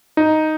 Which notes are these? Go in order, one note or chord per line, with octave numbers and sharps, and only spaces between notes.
D#4